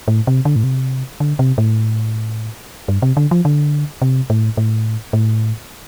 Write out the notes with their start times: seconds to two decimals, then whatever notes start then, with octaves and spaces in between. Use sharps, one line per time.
0.08 A2
0.27 C3
0.45 D3
0.56 A2
0.64 C3
1.20 D3
1.39 C3
1.58 A2
2.88 G2
3.02 C3
3.17 D3
3.31 F3
3.45 D3
4.02 C3
4.30 A2
4.57 A2
5.13 A2